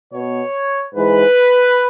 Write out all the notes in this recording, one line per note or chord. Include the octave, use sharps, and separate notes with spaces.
B2 B3 C#5
G#2 E3 G#3 B4